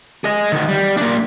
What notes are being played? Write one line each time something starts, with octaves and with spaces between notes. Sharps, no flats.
G#4 D#5
D#3 F#4
G3
A#3 D4